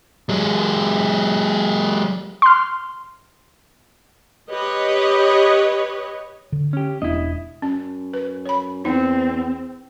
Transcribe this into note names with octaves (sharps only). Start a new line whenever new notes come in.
F#3 G#3
C6 F6
G4 B4 C#5 D#5
D3
C#4 G4
E1 B3 D4 E4 D#5
F#2 C#4
B4
C#5 B5
E2 C4 D#4